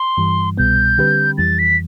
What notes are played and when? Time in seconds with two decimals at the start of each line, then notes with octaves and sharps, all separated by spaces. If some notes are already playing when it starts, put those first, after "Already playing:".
Already playing: C6
0.17 G2 E3 G3
0.57 C2 B2 G3 B3 G6
0.98 D3 G3 C4 G4 B4
1.38 F2 E3 G3 A6
1.59 B6